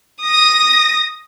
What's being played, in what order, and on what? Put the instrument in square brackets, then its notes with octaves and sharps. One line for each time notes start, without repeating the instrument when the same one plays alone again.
[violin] D#6 A#6